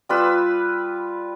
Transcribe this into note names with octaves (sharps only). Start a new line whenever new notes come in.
G3 F4 B4 E6